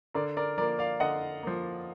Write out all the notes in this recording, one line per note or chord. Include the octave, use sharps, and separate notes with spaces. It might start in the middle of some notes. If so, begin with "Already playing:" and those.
D3 A#4 D5
A#4 D5
F3 A#3 A#4 D5
D5 F5
D3 D#5 F#5
F3 A#3